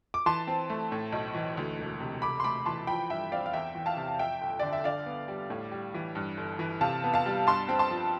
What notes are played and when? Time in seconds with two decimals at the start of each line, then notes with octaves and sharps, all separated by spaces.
0.14 D6
0.26 E3 A5 C6
0.47 C4
0.70 A3
0.92 A2
1.13 B1
1.35 E3
1.57 D2
1.79 E1
2.00 C3
2.22 C3 B5 D6
2.40 C6
2.44 A3 B5 D6
2.66 E3 A5 C6
2.87 F3 G5 B5
3.10 G2 E5 G5
3.32 C4 D5 F5
3.46 F5
3.53 E2 E5 G5
3.75 E3
3.86 F5 A5
3.97 C3
4.19 F2 E5 G5
4.41 G1
4.60 D3 D5
4.73 E5
4.84 D3 D5 F5
5.06 B3
5.28 G3
5.50 A2
5.72 G3
5.94 E3
6.15 G2
6.37 G1
6.59 E3
6.81 C3 F5 A5
7.04 B3
7.14 F5 A5
7.26 G3
7.47 G2 A5 C6
7.69 C4
7.79 A5 C6
7.91 F3